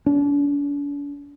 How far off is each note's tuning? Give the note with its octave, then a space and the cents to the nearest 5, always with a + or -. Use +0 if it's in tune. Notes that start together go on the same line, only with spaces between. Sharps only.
D4 -45